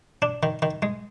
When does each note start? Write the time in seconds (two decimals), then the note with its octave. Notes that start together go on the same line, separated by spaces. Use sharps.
0.22 D4
0.43 D#3
0.62 D#3
0.82 G#3